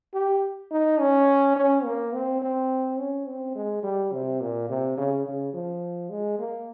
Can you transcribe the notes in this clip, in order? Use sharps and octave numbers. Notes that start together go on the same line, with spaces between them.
G4
D#4
C#4
C#4
A#3
C4
C4
C#4
C4
G#3
G3
C3
A#2
C3
C#3
C#3
F3
G#3
A#3